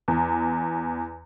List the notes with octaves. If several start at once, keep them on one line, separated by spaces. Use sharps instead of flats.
E2